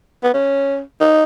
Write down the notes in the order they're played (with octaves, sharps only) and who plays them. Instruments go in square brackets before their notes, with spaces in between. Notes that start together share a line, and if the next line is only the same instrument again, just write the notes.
[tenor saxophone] B3
C#4
D#4